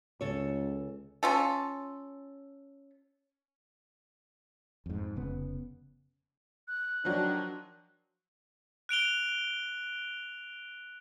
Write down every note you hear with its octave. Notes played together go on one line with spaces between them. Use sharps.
C#2 C#3 A4 C#5
C#4 F4 A4
F2 G#2
F1 C#3 B3
F#6
D#3 F3 F#3 D4
F#6 D7 F7 G7